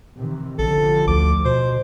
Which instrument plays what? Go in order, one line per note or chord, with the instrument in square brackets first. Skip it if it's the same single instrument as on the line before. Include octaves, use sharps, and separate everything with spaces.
[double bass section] C3 D#3 E3
[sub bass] A1 [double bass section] D3 F3 [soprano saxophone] A4
[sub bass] D2 [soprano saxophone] D6
[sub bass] B2 [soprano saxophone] C5